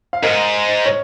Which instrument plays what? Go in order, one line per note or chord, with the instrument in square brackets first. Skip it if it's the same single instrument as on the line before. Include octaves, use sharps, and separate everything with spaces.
[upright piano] F5
[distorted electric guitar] G#2 [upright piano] A#4 D#5
[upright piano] C#5